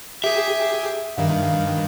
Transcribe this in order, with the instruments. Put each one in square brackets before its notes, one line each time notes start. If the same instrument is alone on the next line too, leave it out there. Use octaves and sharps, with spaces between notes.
[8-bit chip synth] G4 G#4 [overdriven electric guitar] E5
[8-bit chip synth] G2 D#3 [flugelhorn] F5